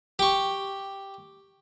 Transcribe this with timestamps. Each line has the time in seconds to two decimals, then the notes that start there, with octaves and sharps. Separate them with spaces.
0.19 G4 C#6